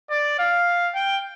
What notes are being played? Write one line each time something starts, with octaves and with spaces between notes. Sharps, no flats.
D5
F5
G5